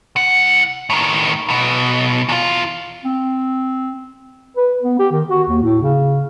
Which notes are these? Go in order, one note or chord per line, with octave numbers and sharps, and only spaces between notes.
C2 F#5
A2 D#3
B1 B2
E2 F4
C4
B4
B3
G4
D#3
F#4
D#2
A2
C#3